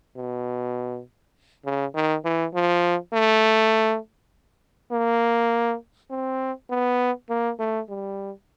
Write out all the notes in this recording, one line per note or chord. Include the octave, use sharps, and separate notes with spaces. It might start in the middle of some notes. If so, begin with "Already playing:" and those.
B2
C#3
D#3
E3
F3
A3
A#3
C4
B3
A#3
A3
G3